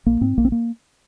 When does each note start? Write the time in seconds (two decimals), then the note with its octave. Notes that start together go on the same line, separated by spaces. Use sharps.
0.06 A#1 A#3
0.21 G#2 C4
0.37 A#1 A#3
0.45 C4
0.52 A#3